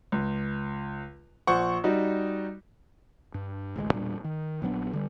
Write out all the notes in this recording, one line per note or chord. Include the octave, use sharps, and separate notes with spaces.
C#2
A#1 C5 F#5 C#6
G3 D#4 F#4
G2
A1 D2 G3 G#3
E1 A#2 G3 D4
D#3
A#1 F#3 B3 D4
D3 G3